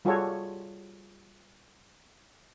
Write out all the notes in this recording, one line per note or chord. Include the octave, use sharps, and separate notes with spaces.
G3 F4 F#4 G#4 A4 C#5